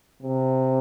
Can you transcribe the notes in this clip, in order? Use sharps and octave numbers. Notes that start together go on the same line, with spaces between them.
C3